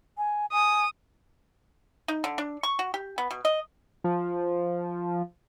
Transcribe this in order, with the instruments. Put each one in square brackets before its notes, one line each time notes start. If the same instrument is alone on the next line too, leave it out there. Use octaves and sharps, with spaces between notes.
[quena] G#5
[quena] G#5 [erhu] D#6
[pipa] D#4
D3
D4
C#6
F#4
G4
B3
B2
D#5
[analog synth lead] F3